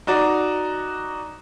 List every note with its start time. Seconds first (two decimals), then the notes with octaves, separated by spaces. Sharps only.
0.07 D#4 F#4 D5 A#5